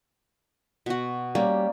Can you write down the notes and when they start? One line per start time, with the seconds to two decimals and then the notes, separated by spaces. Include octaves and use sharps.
0.86 B2 F#4
1.35 G3 A#3 C#4